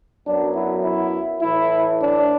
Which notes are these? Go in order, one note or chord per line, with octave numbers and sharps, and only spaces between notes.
F#2 F#3 B3 D4
E4
E4
A2 E3 A3 E4
D4